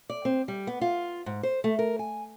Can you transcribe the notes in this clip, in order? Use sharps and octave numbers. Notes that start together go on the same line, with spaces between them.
D5
C4
G3
B3
F4
G#2
C5
A3
A#4
G#5